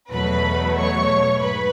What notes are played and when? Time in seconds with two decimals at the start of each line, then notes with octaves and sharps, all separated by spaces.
0.11 E2 B2 F#3 A3 B4 B5
0.76 C#5 C#6
1.41 G#2 B4 B5